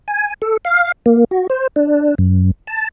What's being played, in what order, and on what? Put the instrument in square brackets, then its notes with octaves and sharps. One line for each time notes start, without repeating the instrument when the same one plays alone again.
[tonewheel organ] G#5
A4
F5
A#3
F#4
C5
D4
F#2
A5